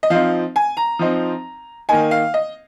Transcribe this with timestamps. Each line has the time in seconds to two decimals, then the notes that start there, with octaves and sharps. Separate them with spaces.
0.03 D#5
0.10 F3 C4 D#4 F5
0.56 G#5
0.77 A#5
0.99 F3 C4 D#4
1.89 D#3 A#3 D#4 G#5
2.11 F5
2.34 D#5